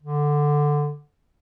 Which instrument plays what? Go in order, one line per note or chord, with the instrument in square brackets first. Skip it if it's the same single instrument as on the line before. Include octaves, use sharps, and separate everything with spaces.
[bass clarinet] D3